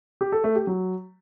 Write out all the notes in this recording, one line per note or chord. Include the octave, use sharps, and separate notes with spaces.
G4
A4
A3
G4
F#3